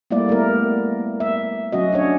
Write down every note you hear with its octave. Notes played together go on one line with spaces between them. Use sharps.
G3 A3 A#3 E4 D5
A3 B3 A#4
E5
F#3 C#4 F#4 D#5
C#4 D4 C#5